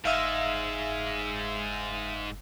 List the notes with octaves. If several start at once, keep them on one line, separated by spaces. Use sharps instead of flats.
F#1 G#2 G#3 E5 F5